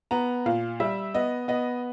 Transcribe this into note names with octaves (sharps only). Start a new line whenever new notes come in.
B3 A#5
A#2 F5
G3 E5
B3 D#5
B3 D#5